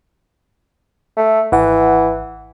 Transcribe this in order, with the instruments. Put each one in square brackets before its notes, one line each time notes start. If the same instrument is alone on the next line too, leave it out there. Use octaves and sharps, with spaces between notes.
[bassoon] A3
[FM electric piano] G#1 F#5 [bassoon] E3